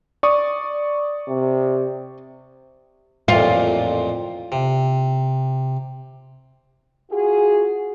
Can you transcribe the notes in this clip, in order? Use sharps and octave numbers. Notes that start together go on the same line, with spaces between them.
D5 C#6 D#6
C3
A1 F2 A#2 F4
C3
F4 F#4 G#4